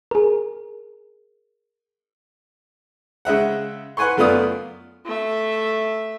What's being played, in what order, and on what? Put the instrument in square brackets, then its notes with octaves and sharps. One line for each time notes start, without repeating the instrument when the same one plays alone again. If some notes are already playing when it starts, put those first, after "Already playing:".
[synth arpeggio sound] G#4 A#4
[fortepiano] C#3 G#3 E5 F#5
B4 F#5 G#5 C6 C#6
F#2 A3 B3 F4 D5 D#6
[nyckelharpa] A3 E5